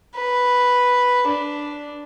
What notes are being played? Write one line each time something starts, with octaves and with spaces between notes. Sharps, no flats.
B4
D4